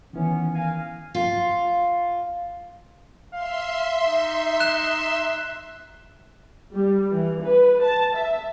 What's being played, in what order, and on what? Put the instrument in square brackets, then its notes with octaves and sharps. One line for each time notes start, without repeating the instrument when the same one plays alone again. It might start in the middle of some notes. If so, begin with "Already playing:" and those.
[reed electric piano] D#3 E3 [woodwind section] B3 C#4
[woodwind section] A#4 F5 G#5
[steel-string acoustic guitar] F4
[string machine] E5 C6 [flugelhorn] F5
[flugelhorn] D#4
[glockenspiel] F#6 E7
[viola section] G3
E3
B4
A5
E5